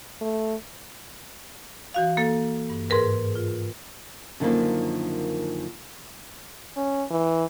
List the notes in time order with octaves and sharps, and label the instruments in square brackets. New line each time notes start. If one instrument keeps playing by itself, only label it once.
[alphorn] A3
[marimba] E3 F#4 F5
A#3 A4
G2
G#2 G#4 A#4 B4
F4
[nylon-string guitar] F#2 D3 D#3 F3 G#3 A#3
[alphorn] C#4
E3